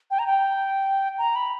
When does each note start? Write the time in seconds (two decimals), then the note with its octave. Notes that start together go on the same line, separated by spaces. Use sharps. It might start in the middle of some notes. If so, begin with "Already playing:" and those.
0.11 G5
0.19 A#5
0.26 G5
1.18 A#5
1.35 B5